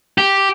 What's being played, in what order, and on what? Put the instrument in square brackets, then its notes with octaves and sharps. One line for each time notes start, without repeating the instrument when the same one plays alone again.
[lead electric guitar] G4